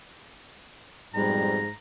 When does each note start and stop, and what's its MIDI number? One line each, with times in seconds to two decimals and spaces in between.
1.14 1.60 41
1.14 1.70 44
1.14 1.60 47
1.14 1.60 55
1.14 1.74 82